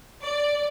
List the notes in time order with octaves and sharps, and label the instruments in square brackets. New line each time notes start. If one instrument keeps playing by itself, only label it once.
[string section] D5